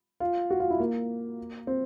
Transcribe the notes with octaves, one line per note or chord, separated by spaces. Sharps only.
F4
F#4
F4
E4
A#3
C4